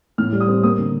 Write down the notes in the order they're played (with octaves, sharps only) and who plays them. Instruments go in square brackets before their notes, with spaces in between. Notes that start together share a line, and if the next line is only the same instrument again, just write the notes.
[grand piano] A2 F6
G3
D#6
C4
A#3 D#6
D3